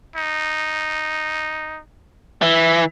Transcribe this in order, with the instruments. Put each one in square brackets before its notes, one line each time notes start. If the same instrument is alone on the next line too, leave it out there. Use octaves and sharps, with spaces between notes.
[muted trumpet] D#4
[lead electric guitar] E3 [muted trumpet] E5